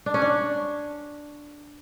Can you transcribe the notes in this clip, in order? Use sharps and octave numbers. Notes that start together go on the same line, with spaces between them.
D4
C#4
D4